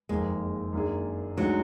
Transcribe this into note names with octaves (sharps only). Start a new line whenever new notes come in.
F#1 F2 D#3 G#3 A#3 D#4
F#2 D#3 A#3 D4 G#4
D2 D3 F#3 G#3 D#4 F#4